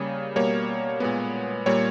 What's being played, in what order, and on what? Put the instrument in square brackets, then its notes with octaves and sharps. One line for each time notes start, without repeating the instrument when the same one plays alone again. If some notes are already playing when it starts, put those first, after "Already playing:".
Already playing: [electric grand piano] C#3 G3 A#3 C#5
B2 G3 A#3 C#5
A#2 G#3 B3
A#2 G3 A#3 C#5